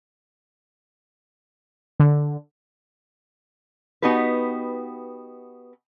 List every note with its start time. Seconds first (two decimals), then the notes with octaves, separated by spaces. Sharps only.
2.00 D3
4.02 B3 D#4 F#4 G4 B4